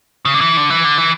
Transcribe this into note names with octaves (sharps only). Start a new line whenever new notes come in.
C#3
D3
E3
D3
E3
D3
E3